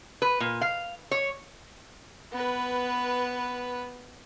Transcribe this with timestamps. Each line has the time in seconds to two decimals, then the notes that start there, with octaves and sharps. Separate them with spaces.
0.22 B4
0.40 A#2
0.61 F5
1.11 C#5
2.32 B3 B4